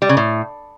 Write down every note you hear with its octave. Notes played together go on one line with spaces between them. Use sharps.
G3
C#3
A2